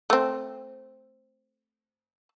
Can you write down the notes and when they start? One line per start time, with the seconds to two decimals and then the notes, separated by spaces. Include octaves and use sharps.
0.10 A3 C4